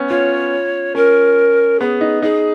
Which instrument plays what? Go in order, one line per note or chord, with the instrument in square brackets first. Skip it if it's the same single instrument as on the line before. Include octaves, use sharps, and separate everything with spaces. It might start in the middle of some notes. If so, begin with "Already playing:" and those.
Already playing: [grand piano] B3 C#4
[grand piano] F4 [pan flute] C#5
[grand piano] C#4 [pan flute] A#4
[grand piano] B3 [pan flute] G#4
[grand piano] D#4
[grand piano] D#4 [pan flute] G#4